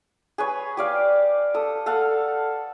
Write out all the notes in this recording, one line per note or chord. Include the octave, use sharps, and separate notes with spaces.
G#4 B4 C#5
G4 D5 F5
A4 D#6
A4 F5 F#5